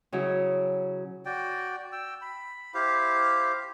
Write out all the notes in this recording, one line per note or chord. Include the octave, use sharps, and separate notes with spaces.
C#3 F#3 E4
F#4 D5 G5
G5 E6
B5
E4 G4 C5 F5